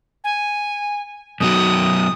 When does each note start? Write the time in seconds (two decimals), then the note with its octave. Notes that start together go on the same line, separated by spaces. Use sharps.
0.24 G#5
1.41 F#2 B2 F#3 D#6